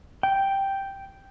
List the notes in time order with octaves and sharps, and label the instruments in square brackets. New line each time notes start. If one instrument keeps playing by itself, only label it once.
[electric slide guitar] G5